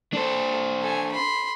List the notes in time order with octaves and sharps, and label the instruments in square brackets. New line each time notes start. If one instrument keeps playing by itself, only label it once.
[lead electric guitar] D4 C5 [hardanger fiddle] A4
[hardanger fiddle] A4 G#5
B5 C6